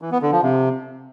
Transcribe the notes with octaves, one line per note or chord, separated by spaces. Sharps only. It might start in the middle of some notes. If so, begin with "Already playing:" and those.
E3
B3
D3
F3
C3